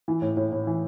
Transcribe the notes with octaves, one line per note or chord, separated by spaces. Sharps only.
E3
A2
A2
A2
E3